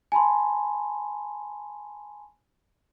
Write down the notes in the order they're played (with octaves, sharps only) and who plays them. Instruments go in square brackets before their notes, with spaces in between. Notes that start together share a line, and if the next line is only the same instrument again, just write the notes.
[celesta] G#5 A5 B5 C6